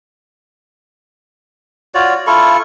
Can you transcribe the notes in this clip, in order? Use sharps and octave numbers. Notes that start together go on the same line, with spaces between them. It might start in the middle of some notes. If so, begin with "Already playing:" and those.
F4 F#4 C#5 D5
E4 F4 A4 C#6